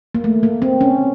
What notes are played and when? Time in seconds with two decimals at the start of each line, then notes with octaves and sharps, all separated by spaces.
0.15 A#3
0.24 A3
0.43 A#3
0.62 C4
0.81 C#4